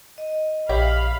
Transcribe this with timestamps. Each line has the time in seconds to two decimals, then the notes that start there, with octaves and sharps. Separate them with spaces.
0.18 D#5
0.69 A#1 G4 C#5 E5 F5 B5